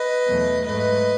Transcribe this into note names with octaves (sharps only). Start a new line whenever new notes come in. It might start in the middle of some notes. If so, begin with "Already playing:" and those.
Already playing: B4 D#5
E2 B2 F#3 A3
G#2 F#3 A3 B4 D#5